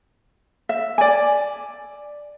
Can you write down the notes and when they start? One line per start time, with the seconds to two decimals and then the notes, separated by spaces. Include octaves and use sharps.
0.69 E5
0.98 D5 G#5